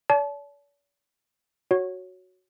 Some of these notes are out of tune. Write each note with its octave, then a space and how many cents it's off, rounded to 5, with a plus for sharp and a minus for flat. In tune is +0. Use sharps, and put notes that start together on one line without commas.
D5 -45 A5 -30
F#4 +0 C#5 +0